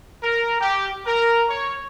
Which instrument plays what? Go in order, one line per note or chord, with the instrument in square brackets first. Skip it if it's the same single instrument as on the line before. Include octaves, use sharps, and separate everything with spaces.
[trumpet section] A#4
G4
A#4
C#5